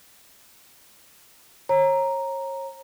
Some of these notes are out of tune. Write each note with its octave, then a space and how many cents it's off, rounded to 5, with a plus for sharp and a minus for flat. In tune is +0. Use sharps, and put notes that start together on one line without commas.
C#5 -35 A#5 +0